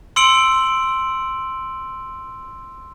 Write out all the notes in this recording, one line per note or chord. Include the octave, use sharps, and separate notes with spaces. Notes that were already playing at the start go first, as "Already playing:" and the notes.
C6 E6 C#7 D7 F#7